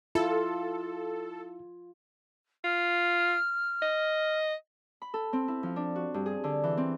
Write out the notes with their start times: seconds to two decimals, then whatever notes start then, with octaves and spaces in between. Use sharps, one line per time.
0.15 E4 F4 A4
2.64 F4 F6
3.82 D#5
5.02 B5
5.14 A4
5.33 C4
5.48 E4
5.63 F3
5.76 D4
5.95 F#4
6.14 G2
6.26 G#4
6.44 D3
6.63 E3
6.77 C4